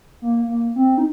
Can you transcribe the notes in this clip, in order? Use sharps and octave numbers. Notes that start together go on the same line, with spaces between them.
A#3
A#3
C4
D#4